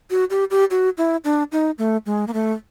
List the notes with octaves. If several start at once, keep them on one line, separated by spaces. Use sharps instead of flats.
F#4
G4
G4
F#4
E4
D4
D#4
A3
G#3
A#3
A3